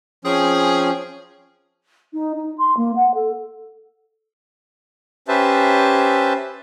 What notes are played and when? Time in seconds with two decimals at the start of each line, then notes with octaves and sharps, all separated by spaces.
0.25 F3 C4 C#4 G#4
2.13 D#4
2.35 D#4
2.58 C6
2.76 A#3
2.95 F#5
3.14 A4
5.28 C#4 G4 B4 C5 E5 A5